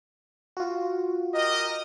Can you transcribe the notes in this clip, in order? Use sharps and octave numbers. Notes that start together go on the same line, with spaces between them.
F4 F#4
G4 A#4 D#5